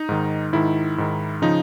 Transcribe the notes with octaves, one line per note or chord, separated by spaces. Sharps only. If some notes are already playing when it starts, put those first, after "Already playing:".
Already playing: D#4
G#2 D#3
G#2 D#3 E4
G#2 D#3
C#3 F3 D#4